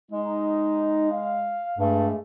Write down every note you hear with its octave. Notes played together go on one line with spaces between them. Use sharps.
G#3 D#4
F5
G2 G#3 A3